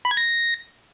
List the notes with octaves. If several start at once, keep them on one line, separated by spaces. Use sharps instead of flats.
B5
G#6
A#6